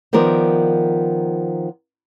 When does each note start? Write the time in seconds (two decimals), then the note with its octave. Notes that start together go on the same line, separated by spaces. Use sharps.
0.13 D#3 F3 B3 A#4 D5